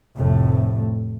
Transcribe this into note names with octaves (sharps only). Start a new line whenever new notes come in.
F1 F2 A2 C3 A3